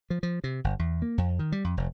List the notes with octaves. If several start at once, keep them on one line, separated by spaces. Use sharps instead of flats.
F3
F3
C3
G1
E2
A#3
F2
D#3
G3
F2
F1